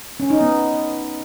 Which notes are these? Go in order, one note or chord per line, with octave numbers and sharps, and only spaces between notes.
C#4
D#4
B3